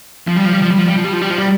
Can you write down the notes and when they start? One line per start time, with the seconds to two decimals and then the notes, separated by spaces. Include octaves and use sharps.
0.27 F3
0.36 G3
0.45 F3
0.53 G3
0.62 F3
0.70 G3
0.78 F3
0.88 G3
0.96 F3
1.04 G3
1.13 F3
1.22 G3
1.30 F3
1.38 G3